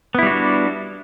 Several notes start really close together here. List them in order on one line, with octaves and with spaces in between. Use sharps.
B3 E4 G3 F#4 D4